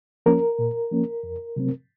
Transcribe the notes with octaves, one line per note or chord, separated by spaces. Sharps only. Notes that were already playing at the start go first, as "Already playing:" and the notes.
F3 A#3 C#4 A#4
A#2
F3 A#3 C#4
F2
C3 F#3 A3 C4